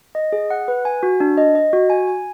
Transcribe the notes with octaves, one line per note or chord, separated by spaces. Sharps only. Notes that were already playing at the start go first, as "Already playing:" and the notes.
D#5
G#4
F#5
B4
G#5
F#4
D4
D#5
D#5
F#4
G#5
G#5